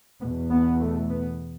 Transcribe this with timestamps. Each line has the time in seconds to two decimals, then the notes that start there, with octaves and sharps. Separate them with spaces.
0.20 E2 B2 B3
0.50 B3
0.80 A3
1.09 B3